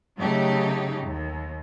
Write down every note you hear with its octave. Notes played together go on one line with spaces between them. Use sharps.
C#3 F#3 A3 D#4 G4
D#2